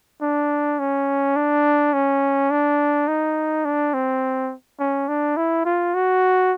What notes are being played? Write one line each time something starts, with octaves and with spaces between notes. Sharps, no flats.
D4
C#4
D4
C#4
D4
D#4
D4
C4
C#4
D4
E4
F4
F#4